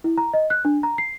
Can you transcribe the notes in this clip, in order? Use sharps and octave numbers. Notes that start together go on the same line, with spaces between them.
E4
A#5
D#5
F#6
D4
A#5
C7